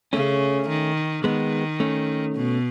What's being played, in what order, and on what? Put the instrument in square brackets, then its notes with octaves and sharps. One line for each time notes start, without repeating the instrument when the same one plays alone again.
[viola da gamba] C#3 [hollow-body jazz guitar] A3 C#4
[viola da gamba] D#3
[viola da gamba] D#3 [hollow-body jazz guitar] G#3 B3
[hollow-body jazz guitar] A3 C#4
[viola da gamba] B2